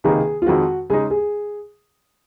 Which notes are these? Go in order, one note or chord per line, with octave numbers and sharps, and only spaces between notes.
C#2 C3 D#3 A#3 D#4 G#4
F4
F2 D#3 G#3 C4 F#4
C#3 G#3 D#4 G#4
G#4